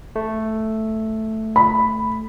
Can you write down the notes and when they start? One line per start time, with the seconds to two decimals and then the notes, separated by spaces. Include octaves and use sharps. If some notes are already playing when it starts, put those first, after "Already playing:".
0.16 A3
1.56 B5